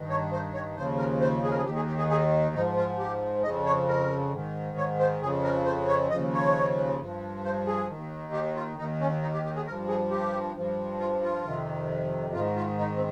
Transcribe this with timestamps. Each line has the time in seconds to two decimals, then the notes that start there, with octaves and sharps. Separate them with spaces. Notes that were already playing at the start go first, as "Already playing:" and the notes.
Already playing: G2 D#3
0.09 C#5
0.32 C5
0.54 C#5
0.76 D#2 C#3 F3 C5
0.98 A#4
1.20 C5
1.43 G#4
1.50 A#4
1.57 G#4
1.65 D#2 D#3 G4
1.76 G#4
1.87 G4
1.98 G#4
2.10 G#4
2.54 G#2 F3 D#4
2.77 F4
2.98 G4
3.43 F2 C#3 F3 D#5
3.65 C#5
3.88 A#4
4.32 G#2 D#3
4.77 C#5
4.99 C5
5.21 F2 C#3 F3 G#4
5.43 A#4
5.65 C5
5.88 C#5
6.10 D#2 C#3 F3 D#5
6.33 C#5
6.99 G2 F3
7.44 C5
7.66 G#4
7.88 D#3
7.93 D#2
8.32 G4
8.55 F4
8.77 D#2 D#3 D#4
9.00 C#4
9.22 D#4
9.34 G4
9.44 G4
9.56 G#4
9.66 G2 F3 A#4
9.88 G#4
10.11 G4
10.55 G2 F3
10.99 F4
11.22 F4
11.45 F2 C3 D#3
12.33 G#2 D#3 F4
12.56 F4
12.78 D#4
12.96 C4